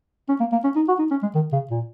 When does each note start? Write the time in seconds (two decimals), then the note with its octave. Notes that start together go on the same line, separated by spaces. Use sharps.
0.29 C#4
0.40 A#3
0.52 A#3
0.64 C#4
0.76 D#4
0.88 F#4
0.99 D#4
1.11 C#4
1.23 G#3
1.35 D#3
1.53 C#3
1.71 A#2